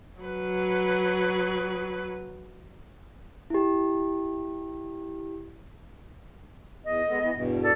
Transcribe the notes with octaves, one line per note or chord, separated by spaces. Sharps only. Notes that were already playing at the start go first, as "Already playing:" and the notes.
F#3 B4
E4 G4
E2 D#5
G#3 B3 A4
E3 B3
E2 G2 B2
A4 D5